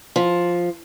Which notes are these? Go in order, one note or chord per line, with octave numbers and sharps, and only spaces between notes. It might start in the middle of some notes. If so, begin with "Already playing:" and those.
F3